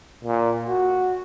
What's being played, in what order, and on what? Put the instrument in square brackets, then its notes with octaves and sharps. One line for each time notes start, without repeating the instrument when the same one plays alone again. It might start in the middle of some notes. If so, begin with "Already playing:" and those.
[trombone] A#2
F#4